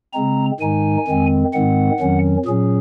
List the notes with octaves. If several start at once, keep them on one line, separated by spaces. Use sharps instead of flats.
C#3 G#3 C4 A#5
G#2 D#3 G#3 D#4 G#5
F2 D#3 G#3 C4
G#2 D#3 G#3 C4 F#5
F2 D#3 F#3 C#4
A#2 F#3 C#4 G#4